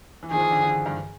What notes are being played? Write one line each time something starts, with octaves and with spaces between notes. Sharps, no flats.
E3
D#3 F3 G#4
E3
D3
D3
G2